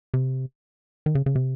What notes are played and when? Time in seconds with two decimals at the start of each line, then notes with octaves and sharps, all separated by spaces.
0.14 C3
1.06 D#3
1.15 C#3
1.26 C#3
1.35 C3